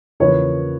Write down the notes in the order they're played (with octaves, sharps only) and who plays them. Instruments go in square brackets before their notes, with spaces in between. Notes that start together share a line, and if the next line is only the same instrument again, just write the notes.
[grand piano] E2 C#3 F3 A#3 B4 C#5